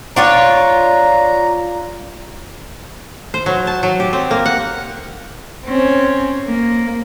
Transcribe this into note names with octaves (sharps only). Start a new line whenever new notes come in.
D4 F4 C#5 A#5
C5
F#3
A5
F#3
G4
C4
A#3
F#5
C4 C#4
A#3